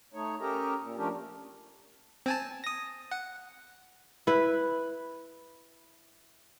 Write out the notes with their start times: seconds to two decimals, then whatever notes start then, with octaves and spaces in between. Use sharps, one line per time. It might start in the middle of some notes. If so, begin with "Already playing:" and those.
0.14 A3 D#4 C#5
0.41 C#4 G4 A4 A#4 D#5 A#5
0.80 A#2
0.97 F3 A3 C#4 D4 G4 A#4
2.26 C4 G#5 A5
2.64 D#6 A#6
3.11 F#5
4.27 E4 B4